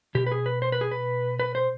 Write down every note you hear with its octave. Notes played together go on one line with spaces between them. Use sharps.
B2 G4
B4
G#4
B4
C5
B4
G#4
B4
B4
C5